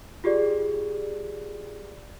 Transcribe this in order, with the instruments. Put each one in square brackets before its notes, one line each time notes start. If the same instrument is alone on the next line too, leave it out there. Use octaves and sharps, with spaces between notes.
[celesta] F4 G4 G#4 D5